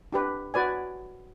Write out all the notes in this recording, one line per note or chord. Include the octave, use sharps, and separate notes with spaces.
D4 G4 B4
F#4 B4 D5 G#5